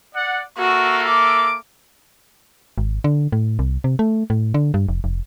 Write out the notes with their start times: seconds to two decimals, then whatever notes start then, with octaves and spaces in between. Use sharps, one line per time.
0.14 D5 F#5
0.58 A#3 F#4 A4 E5
1.08 D6
2.78 G#1
3.04 D3
3.32 A2
3.59 C2
3.84 C3
3.99 A3
4.30 A2
4.54 D3
4.74 G2
4.89 F1
5.04 F1